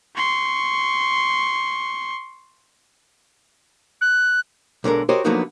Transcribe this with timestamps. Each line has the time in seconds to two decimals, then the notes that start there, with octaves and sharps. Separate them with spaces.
0.16 C6 C#6
4.01 F#6
4.84 B1 D3 G#3 A#4
5.09 F#4 G4 A#4 C5 C#5 D#5
5.25 D3 F3 F#3 A#3 B3 D#4